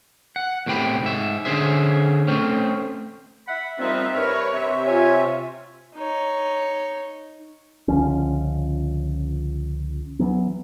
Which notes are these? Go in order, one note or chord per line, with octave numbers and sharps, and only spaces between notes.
F#5
E2 A2 C3 G5 B5
G#2 E5
D3 C#4 G#4 C5 E5
A3 C4 C#4
E5 F#5 B5
F3 G3 B3 C4 D#4 A#4 E5
G2 A#4 B4 C#5
C3 C4 E5
F4 C#5 G#5
D#4 C#5
C#2 D3 F3 C#4
E3 F#3 B3